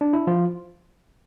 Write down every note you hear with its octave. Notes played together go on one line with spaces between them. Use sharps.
D4
E4
F3 F4